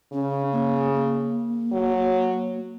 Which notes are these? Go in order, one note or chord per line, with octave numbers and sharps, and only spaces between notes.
C#3 C#4
A#3
A#3
F#3